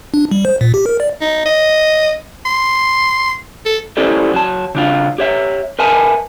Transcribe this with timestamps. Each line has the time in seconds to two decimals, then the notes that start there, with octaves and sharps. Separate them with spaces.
0.14 D4
0.31 G3
0.45 C5
0.61 A#2
0.74 G4
0.86 A#4
1.00 D5
1.21 D#4
1.45 D#5
2.45 C6
3.66 A4
3.97 C#4 E4 G4 A4 C5 D5
4.34 F#3 A5
4.75 C#3 D4 F4
5.18 G4 C#5 E5
5.79 A#4 B4 E5 G#5 A5